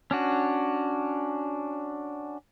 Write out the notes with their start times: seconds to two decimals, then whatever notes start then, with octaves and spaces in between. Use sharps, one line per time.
0.11 C#4 D4 F#4